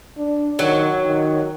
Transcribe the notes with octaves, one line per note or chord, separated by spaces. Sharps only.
D4
D#3 F#3
D#3